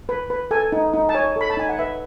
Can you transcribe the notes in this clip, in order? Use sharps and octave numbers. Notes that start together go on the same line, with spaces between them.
B4
B4
A4 G#5
D#4
D#4
A5
C#5 G#5
A4 B5
A5
D#4 G#5
F#5
B4 E5